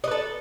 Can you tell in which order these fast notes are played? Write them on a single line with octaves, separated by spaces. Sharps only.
D#5 B4 A4